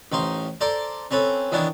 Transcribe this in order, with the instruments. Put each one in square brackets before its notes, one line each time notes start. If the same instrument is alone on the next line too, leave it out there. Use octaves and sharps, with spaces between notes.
[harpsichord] A1 D#4 C5 F5
A4 A#4 C5 D5
C4 C#4 A4 B4
D#3 E3 B3 D4 E4 C#5